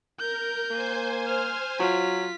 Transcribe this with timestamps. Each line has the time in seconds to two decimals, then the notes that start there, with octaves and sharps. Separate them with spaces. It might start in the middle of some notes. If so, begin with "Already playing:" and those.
0.19 A#4 G6
0.70 A#3 C5 G#5
1.27 F6
1.80 F#3 F4 B6